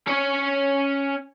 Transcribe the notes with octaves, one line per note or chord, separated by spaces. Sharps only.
C#4 C#5